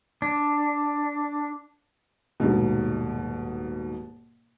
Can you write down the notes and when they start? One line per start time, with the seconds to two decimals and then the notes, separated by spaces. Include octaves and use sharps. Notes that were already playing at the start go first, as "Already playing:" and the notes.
0.22 D4
2.40 D#1 G#2 B2